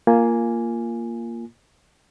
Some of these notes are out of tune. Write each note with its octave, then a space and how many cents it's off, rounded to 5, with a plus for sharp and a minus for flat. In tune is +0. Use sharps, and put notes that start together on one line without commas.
A#3 +0 F4 -10 G#5 +0